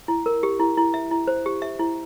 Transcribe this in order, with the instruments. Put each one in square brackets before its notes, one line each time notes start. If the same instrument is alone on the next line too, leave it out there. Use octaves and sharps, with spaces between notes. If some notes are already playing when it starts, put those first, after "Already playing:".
[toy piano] E4
A#4
G4
E4
E4
E5
E4
C5
G4
E5
E4